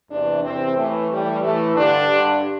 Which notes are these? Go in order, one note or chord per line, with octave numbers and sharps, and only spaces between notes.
E2 C3 E3 D4
E2 C3 E3 C4
A2 E3 A3
A2 E3 G3
A2 E3 A3
G2 D3 D4
G2 D3